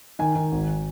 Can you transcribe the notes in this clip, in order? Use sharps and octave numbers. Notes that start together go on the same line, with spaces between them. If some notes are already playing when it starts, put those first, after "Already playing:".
D#3 G#5
D#3
G#1